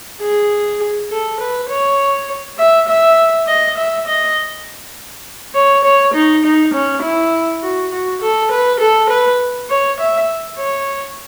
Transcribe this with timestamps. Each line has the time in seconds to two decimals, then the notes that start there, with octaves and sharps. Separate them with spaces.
0.21 G#4
1.11 A4
1.41 B4
1.70 C#5
2.59 E5
2.88 E5
3.47 D#5
3.78 E5
4.07 D#5
5.55 C#5
5.84 C#5
6.14 D#4
6.44 D#4
6.74 C#4
7.03 E4
7.63 F#4
7.92 F#4
8.22 A4
8.52 B4
8.80 A4
9.10 B4
9.69 C#5
10.00 E5
10.58 C#5